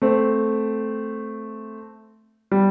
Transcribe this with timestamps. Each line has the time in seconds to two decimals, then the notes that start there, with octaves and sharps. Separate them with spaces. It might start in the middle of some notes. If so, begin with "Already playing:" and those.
0.02 A3 C4
2.52 G3